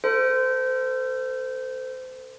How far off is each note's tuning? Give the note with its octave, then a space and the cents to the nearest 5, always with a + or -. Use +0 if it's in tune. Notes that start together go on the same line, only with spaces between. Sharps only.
A4 +30 C5 -25